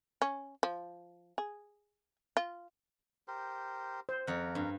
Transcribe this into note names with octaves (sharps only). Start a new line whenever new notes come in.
C#4
F3
G#4
F4
G4 A#4 C5
C5
F2 A#4 F#5
G2